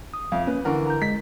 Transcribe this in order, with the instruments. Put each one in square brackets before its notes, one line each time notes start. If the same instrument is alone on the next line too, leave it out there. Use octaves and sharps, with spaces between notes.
[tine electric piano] D#6
[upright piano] F2 [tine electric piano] E5 F5
[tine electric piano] A#3 C#4 [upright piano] B4
[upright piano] D3 E3 A#4 [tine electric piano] F#5 C#6
[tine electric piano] A#5 G6
[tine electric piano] G#3 [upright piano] B6